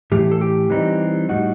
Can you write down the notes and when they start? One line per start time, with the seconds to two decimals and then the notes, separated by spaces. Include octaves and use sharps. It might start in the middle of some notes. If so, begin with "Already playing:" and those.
0.12 A2 E3 A3 G4
0.32 A4
0.41 G4
0.70 E3 G3 C4 D#4
1.29 A2 G3 D#4 F#4